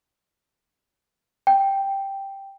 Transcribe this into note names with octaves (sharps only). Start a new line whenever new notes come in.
G5